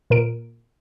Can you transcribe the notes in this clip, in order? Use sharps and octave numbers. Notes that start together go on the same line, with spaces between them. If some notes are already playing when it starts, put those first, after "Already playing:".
A#2 A#4 D7